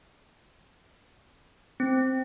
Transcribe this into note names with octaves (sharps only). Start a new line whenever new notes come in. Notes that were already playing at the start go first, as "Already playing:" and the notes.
C4